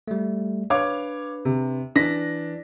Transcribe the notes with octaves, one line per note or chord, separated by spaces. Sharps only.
G3 A3
D4 B4 C#5 F5 D6
C3
E3 D4 A#6 B6